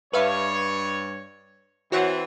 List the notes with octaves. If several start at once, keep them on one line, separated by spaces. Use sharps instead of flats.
G2 B4 C#5 E5 F5
E3 C4 F#4 C#5 F#5